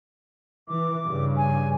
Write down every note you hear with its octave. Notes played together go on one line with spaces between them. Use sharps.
E3 D6
G2 C#3
G#5